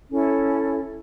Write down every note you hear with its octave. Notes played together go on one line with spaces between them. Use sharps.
C#4 E4 A4